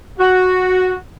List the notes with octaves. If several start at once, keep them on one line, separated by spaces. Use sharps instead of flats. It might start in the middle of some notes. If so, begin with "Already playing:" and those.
F#4